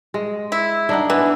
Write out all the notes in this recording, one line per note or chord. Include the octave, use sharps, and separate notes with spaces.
G#3
E4
D4 D#4 F#5
E3 B3